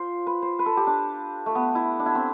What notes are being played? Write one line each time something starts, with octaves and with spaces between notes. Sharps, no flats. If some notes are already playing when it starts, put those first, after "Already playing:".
Already playing: F4 C5
B4
C5
B4
A4
G4
D4
A3
B3
E4
D4
E4
C4